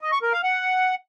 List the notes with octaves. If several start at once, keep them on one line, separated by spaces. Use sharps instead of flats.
D#5
C#6
A#4
F5
F#5